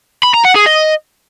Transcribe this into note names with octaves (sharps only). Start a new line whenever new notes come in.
B5
A#5
F#5
G#4
D#5